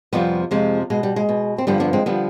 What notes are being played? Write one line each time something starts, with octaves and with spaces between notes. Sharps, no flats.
F2 C3 F3 G3 B3
F2 C3 F3 G#3
B2 G#3
G3
G#3
B2
C4
G2 D3 F3 G3 B3
B3 D4
G#3 C4
D3 F3 G3 B3